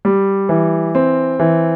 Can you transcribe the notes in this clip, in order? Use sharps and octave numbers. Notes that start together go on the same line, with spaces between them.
G3
E3
C4
E3